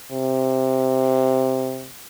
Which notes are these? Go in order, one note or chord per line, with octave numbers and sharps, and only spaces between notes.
C3